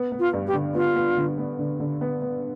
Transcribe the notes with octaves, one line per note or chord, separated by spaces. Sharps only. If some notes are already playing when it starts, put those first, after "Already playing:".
Already playing: B3
B3
F4
G2
G4
D3
B3 F4
B3
D3
B3
D3
D3
B3
B3